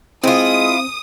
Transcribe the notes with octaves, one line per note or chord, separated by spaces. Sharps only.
G#3 C4 E4 F4 D#6